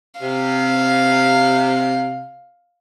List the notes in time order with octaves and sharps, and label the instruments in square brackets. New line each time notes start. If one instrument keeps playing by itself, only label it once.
[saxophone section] C3 [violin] F5